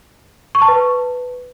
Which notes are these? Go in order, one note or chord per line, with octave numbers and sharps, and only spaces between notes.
C#6
A5
B4